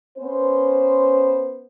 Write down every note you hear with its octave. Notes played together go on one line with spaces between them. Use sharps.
B3 C#4 B4 C5